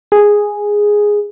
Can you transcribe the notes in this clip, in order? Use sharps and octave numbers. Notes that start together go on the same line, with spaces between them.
G#4